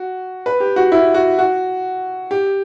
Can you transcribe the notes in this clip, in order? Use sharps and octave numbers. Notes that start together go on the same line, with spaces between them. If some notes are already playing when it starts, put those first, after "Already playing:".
Already playing: F#4
B4
G4
F#4
E4
F#4
F#4
G4